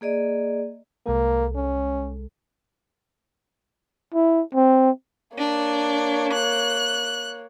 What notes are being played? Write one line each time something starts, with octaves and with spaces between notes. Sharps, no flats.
A#3 G#4 D5 D#5
C2 G#3 A#3 A4
C#4
E4
C4
A#3 D4 C#5
F#6